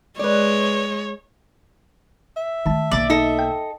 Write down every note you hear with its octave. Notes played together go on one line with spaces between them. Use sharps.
G#3 B4 C#5 D5
E5
D#3 G#3 A3 A5
B1 A#3 D5
D#4 A4 D#5
G5